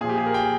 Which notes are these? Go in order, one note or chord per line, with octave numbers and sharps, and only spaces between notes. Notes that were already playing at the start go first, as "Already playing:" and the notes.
A#2 F3 G#4
G4
G#4
A#4
G5